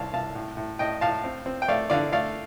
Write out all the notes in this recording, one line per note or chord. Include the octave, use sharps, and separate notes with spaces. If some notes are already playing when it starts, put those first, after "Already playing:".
Already playing: C2 F5 A5
C2 F5 A5
A2
A2
A2 D#5 G5
A2 F5 A5
C4
C4
G5
A3 D5 F5
D3 D5 F5
A3 D5 F5